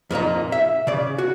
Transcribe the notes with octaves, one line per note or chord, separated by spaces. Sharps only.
F2 A#2 A#3 D#4
E5
C#3 D5
F#4